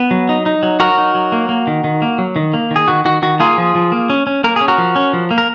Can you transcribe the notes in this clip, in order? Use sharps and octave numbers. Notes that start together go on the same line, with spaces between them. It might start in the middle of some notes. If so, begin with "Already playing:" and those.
Already playing: B3
F#3
D#4
D#4
F#3
F#3 F#4 A#4
D#4
F#3
A#3
A#3
D#3
D#3
A#3
F#3
D#3
A#3
D#3 G#4
D#3 F#4
D#3 F#4
D#3 F#4
A#3 F4 G#4
F3
F3
A#3
C#4
C#4
A#3 A#4
C#4 G#4
F#4 A#4
F3
C#4
F3
A#3
A#4